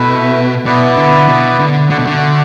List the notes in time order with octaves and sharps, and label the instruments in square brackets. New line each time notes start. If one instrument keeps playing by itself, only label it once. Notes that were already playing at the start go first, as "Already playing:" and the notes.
Already playing: [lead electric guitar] B2 [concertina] A3 E4 B4 E5
[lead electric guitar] B2 [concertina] B3 E4 B4 D5
[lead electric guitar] D3
B2
D3
[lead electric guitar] D3 [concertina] A3 F#4 D5 F#5
[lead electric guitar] B2
D3